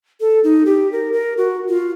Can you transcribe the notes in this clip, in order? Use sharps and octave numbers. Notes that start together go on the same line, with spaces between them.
A4
D#4
G4
A#4
A#4
F#4
F4